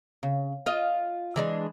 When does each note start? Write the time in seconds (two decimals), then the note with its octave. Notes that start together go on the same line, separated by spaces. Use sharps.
0.23 C#3
0.66 F4 D#5
1.36 E3 G#3 D4